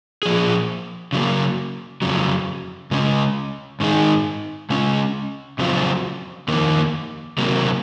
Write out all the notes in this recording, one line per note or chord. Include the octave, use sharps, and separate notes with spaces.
A#2 F3 G#4
C#3 F#3 A#3
F2 C#3 F#3
C#3 G#3 C#4
G#2 D#3 G#3 D#4 G#4
C#3 G#3 C#4
F2 C#3 F#3 C4 F4
F2 D#3 A#3
C3 F#3 A#3